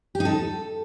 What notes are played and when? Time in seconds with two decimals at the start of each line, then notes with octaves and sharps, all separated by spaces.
0.15 G4
0.20 D#4
0.25 A4